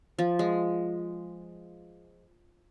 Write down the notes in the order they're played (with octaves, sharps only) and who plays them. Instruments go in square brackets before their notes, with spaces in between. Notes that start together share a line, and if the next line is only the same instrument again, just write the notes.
[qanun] F3
G#3